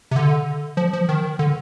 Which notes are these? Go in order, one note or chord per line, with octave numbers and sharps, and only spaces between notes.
C3
D3
F3
F3
D#3
D3